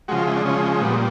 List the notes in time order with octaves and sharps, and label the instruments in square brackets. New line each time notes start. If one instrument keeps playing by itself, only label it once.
[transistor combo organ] C#3 F3 G#3 F#4
F4
E4
D4
C#3 F3 G#3 C#4
A#2 G3 B3